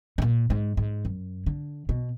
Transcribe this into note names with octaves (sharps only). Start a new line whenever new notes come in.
G#2
A#2
G#2
G#2
F#2
D3
B2